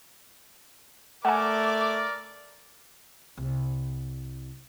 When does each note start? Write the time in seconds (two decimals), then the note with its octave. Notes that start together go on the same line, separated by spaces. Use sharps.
1.25 A3 A#4 D5 F#5 G#5 D6
3.37 C2